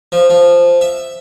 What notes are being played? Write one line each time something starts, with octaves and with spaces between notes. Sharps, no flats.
F3
F3
E5